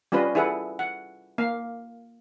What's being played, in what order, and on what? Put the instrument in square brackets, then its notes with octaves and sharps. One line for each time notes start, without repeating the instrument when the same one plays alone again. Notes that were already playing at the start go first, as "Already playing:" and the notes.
[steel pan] G3 C#4 F4 B4 D#5
E4 G#4 A4 B4 F#5
F#5
A#3 F5